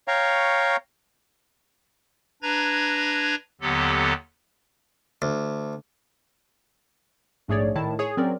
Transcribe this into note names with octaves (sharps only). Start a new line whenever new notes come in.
C#5 F5 G5 A#5 C#6
D4 B4 A#5 G#6 A#6
D#2 D3 F#3 B3 G4 A4
D2
A#1 G#2 A3 G#4 C#5 D5
A2 D#3 E4 A5
G#4 C#5
F#3 C4 C#4 A#4 D5